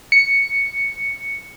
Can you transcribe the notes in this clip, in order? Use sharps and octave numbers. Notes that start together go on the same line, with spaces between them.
C#7